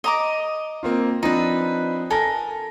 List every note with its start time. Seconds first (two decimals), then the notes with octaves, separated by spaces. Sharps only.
0.04 D#5 A#5 D6
0.83 A#3 C4 F4
1.23 F3 C4 D4 D#4 B4
2.10 A4 A#4 G#5 A#6